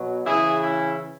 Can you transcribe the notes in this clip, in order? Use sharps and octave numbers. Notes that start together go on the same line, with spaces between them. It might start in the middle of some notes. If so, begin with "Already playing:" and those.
Already playing: B2 F#3
C#3 E3 E4 G#4
C#4 E4